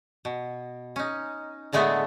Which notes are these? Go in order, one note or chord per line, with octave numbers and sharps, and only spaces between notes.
B2
C#4 D#4
A2 D3 G#3 A3 B3